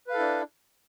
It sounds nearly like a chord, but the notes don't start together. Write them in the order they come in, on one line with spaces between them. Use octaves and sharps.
B4 F5 A4 E4 D4